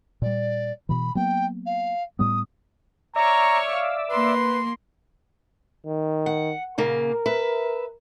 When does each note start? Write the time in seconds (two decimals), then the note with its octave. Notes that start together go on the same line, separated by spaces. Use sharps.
0.22 A#2 G3 D5
0.89 B2 E3 B5
1.15 F#3 A#3 B3 G5
1.66 F5
2.19 A2 G3 B3 D#6
3.16 C#5 D5 E5 A#5 C#6 F6
3.73 F5
4.10 A#3 B4 C6
5.86 D#3
6.26 F#5
6.78 A#2 C#3 A#3 A#4
7.26 B4 E5